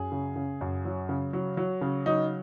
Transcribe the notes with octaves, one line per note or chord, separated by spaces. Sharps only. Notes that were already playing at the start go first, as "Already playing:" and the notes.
Already playing: F#2 G#4
C#3
C#3
F#2
F#3
C#3
F#3
F#3
C#3
F#3 D#4